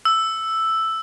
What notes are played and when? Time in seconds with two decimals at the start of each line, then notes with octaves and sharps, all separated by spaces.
0.05 E6